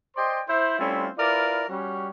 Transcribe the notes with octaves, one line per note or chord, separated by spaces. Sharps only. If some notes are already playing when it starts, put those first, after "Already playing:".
C5 D5 D#5 G5 C6
E4 C5
G3 A3 C4 C#4 E4 F4
E4 F4 A#4 B4 D5
G3 C#4 F#4